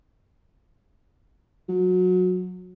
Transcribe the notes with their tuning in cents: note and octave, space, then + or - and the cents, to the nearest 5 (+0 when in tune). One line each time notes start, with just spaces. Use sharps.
F#3 -25